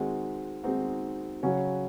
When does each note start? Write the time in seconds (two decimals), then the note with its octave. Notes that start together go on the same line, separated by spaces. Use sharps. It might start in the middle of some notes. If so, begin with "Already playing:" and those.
Already playing: D#3 G#3 C4 D#4 F#4
0.63 D#3 G#3 C4 D#4 F#4
1.43 C#3 F#3 C#4 F#4